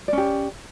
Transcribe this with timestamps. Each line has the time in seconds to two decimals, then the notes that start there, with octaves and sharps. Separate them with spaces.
0.08 D5
0.13 C#4
0.18 G4